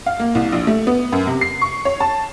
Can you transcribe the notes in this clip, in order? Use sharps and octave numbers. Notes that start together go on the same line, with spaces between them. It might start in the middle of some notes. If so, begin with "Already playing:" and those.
F5
A#3
C2
A#1
A3
B3
F#2
C3
C7
C#6
C#5
A5